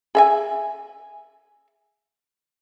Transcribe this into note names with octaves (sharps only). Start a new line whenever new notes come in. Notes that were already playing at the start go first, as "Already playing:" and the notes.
G#4 E5 G#5